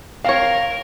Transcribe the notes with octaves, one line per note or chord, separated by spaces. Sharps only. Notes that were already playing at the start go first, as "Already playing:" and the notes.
C4 A#4 C#5 F5